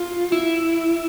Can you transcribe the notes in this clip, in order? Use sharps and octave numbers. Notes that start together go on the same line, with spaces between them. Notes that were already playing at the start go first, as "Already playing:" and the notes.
Already playing: F4
E4